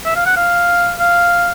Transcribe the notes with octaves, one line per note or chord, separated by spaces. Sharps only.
E5
F5
F#5
F5
F5